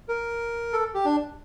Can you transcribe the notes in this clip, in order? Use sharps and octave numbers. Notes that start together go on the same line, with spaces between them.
A#4
A4
G4
D4